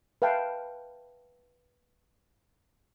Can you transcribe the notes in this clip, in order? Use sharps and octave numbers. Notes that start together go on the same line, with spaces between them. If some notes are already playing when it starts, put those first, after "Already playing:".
B4 E5 F5 G5 A5